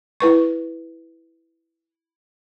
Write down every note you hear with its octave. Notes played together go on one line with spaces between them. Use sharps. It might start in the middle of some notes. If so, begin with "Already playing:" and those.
E4 B4 C#6